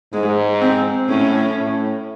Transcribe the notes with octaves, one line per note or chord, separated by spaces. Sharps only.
G#2 G#3
C4
A2 C#4
A2